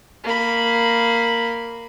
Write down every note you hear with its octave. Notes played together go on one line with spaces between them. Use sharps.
A#3 B5